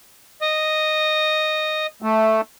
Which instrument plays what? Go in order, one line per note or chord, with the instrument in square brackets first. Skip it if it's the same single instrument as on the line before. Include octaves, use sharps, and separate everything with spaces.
[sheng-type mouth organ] D#5
[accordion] A3